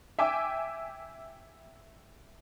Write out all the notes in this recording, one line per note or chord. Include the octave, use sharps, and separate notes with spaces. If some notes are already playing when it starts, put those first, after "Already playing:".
E5 G5 G#5 D6 E6